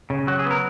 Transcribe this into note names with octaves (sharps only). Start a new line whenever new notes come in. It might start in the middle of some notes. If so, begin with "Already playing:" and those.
C#3
F#3 F#4
G#4
B3
A#4